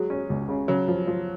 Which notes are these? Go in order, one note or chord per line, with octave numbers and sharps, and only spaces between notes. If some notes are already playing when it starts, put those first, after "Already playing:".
Already playing: F#3 G#3
C#4
C#2
C#3
C#3 F#3
F3
F3